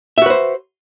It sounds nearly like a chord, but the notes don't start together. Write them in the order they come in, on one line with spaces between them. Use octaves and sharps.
E5 F#4 B4 C5